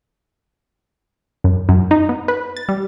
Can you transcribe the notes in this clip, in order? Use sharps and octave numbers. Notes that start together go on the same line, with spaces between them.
F#2
F#2
D#4
B3
B4
A6
G3